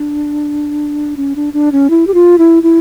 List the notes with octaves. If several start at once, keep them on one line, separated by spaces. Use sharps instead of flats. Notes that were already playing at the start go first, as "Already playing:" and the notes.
Already playing: D4
C#4
D4
D4
C#4
E4
G4
F4
E4
E4